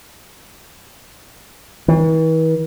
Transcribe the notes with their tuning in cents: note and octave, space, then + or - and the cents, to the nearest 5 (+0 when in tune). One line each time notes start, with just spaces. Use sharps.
E3 -40